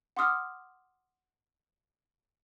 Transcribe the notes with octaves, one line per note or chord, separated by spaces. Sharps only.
F#5 C6 D6 D#6 F6